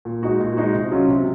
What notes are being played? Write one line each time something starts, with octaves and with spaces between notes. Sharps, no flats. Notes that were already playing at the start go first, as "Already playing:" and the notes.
A#2
G#3 D#4 F#4
A#2
G#3 D#4 F#4
C3
F#3 C#4 F4
C3